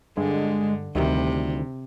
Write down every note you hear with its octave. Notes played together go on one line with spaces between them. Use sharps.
G2 D3 G#3
D2 C3 D#3 G3 E4